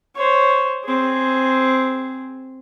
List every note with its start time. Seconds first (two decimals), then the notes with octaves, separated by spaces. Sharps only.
0.15 C5 C#5
0.84 C4 G#4